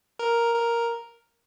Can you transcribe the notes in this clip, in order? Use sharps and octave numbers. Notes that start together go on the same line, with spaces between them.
A#4
A#4